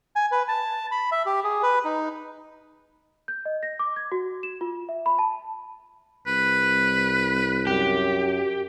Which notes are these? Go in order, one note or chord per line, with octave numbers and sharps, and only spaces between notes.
G#5
B4
A5
B5
E5
G4
G#4
B4
D#4
G6
D#5
A#6
D6
G#6
F#4
E7
F4
E5
B5
A5
C2 B4
F#2 G4